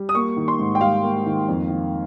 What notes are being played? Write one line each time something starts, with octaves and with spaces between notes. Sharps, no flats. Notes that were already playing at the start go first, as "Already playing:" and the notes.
Already playing: G3
D#6
A#3 C#6
D#3
C6
G#2
G5
G3 F5
A#3
D#3
F2
D#3